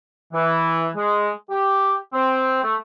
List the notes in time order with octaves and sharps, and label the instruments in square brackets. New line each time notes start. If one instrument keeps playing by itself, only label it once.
[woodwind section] E3
G#3
G4
C4
A3